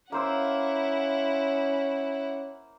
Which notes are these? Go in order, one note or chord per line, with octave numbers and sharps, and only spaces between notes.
A#3 C#4 E4 C5 F#5 E6